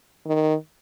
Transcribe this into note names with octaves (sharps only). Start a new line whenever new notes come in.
D#3